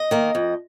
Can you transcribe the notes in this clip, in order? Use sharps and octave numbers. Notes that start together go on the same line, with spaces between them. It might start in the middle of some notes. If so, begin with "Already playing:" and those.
Already playing: D#5
D#3 A#3
F2